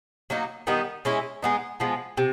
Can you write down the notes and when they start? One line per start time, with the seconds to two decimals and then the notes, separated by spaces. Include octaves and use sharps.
0.30 F#3 A#3 D#4
0.67 D#3 G3 B3 D#4
1.05 G#3 C#4 E4
1.42 G#3 B3 D#4
1.80 F3 G#3 B3
2.17 C3